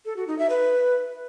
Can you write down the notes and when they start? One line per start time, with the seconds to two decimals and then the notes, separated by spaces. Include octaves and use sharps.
0.05 A4
0.16 F#4
0.27 D#4
0.39 E5
0.50 B4